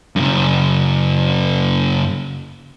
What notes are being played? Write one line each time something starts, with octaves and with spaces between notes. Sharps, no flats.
F#2 C#3